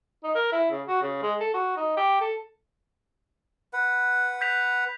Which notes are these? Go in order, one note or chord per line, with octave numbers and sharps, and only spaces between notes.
D#4
A#4
E4
C#3
F#4
C#3
G#3
A4
F#4
D#4
G4
A4
B4 F#5
G6 B6 F7